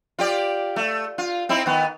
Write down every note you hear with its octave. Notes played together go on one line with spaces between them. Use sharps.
F4 G4 D5
A3
F4
C4 D#4 E4
D#3 B3